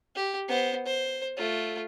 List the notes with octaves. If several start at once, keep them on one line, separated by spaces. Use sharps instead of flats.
G4
B3 C5
C5
A3 F4